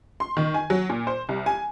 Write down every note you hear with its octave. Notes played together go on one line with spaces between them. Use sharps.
C6
D#3
G#5
F#3
A#2
C5
C2
G#5